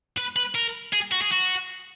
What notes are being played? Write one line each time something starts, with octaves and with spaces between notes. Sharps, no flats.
B4
B4
A#4
G#4
F#4
G#4
F#4